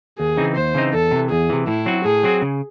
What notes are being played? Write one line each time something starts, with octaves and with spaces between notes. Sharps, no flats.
D#2 G#4
C#3 E3 C4 D#4
D#2 C5
C#3 E3 C4 D#4
E2 A4
C3 E3
E2 G#4
C3 E3
A2 E4
F#3 C4 F#4
A2 G#4
F#3 C4 F#4
C#3